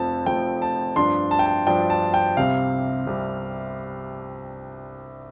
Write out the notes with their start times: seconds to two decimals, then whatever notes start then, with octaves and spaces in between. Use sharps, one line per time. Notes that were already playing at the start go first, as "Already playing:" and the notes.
Already playing: F1 F2 F3 C4 A5
0.26 F1 F2 F3 C4 G5
0.62 A5
0.96 G2 F3 D4 C6
1.31 A5
1.39 G5
1.46 A5
1.67 G2 F3 D4 G5
1.90 A5
2.14 G5
2.37 C2 C3 G3 C4 F5
3.07 C2 C3 G3 C4